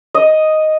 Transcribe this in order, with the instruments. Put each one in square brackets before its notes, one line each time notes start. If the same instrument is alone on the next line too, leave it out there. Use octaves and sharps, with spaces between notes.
[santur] D#5